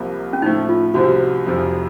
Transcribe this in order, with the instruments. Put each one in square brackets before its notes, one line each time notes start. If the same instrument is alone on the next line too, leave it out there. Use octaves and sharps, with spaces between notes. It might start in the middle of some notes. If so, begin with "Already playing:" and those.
Already playing: [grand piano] C2 C3 F3 A#3
[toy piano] C#4
[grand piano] A2 F3 A3 [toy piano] D#4
[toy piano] F4
[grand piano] C2 C3 F3 C4 [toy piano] F#4
[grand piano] F1 F2 C3 F3